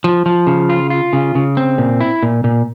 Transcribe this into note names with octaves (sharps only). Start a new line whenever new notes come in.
F3
F3
C#3
F4
F4
C#3
C#3
C4
A#2
E4
A#2
A#2